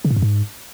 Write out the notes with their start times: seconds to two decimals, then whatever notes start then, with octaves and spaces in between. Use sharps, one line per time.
0.05 C#3
0.11 A2
0.16 F#2
0.22 G#2